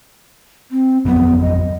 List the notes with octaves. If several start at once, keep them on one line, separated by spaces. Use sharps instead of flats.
C4
G#1 F2 F#3 B3
D#5